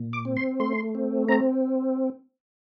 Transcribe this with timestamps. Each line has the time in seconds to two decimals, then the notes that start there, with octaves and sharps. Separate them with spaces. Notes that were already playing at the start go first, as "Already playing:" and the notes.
Already playing: A#2
0.13 D6
0.25 C4
0.37 C6
0.60 A3 C6
0.95 C4
1.28 C4 A#5